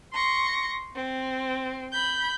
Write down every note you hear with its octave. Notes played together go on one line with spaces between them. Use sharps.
C6 C#6 A#6
C4
B5 G6